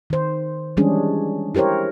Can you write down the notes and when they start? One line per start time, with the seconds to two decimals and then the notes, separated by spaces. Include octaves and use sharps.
0.10 D#3 C5
0.77 E3 G3 G#3 C#4 D4 G#4
1.55 E4 G4 A#4 C5 C#5